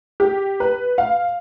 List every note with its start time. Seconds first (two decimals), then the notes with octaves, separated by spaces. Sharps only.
0.20 G4
0.60 B4
0.98 F5